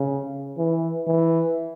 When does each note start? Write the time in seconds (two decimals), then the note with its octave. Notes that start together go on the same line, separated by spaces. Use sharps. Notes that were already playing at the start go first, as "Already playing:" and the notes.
Already playing: C#3
0.58 E3
1.07 E3